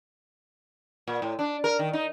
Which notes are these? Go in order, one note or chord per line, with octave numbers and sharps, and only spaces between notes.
A#2
A2
D4
A#4
D#3
D#4